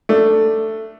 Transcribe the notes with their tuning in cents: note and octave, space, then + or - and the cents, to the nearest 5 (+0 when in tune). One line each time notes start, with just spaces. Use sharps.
A3 +10 D4 +10